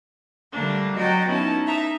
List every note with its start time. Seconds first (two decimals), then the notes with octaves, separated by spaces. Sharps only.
0.52 D3 G3 A3 A#3 D4
0.95 F#3 F#4 D#5 G5 A#5 A6
1.27 B3 C#4 D#4 E4 A5
1.66 D#4 E5 A#5